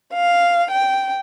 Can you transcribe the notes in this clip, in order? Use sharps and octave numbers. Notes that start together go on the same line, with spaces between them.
F5
G5